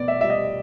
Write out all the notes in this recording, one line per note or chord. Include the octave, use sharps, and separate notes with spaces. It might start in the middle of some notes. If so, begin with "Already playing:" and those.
Already playing: B2 B3 D5
E5
G3 E5
D#5